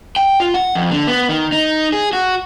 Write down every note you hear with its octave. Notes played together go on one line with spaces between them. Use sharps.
G5
F4
F#5
F2
D3
B3
D#3
D#4
G#4
F#4